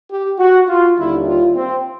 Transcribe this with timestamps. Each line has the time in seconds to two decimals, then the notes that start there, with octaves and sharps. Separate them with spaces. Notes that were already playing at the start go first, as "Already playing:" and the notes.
0.10 G4
0.39 F#4
0.68 F4
0.97 D#2 D3 G3 E4
1.26 F4
1.56 C4